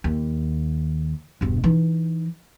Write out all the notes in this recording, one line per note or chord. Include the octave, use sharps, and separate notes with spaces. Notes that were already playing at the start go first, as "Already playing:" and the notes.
D#2
E1 G2
E3 D#4